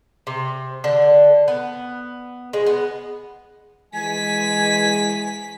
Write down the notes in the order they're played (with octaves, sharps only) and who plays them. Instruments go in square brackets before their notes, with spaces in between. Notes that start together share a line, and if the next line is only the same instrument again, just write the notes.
[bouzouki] C3
D3
B3
G#3
B3
[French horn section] E3 G#3 [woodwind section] G#5 [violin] B6